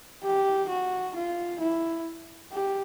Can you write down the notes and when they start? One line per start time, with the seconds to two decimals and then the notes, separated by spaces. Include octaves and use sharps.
0.24 G4
0.69 F#4
1.16 F4
1.61 E4
2.53 G4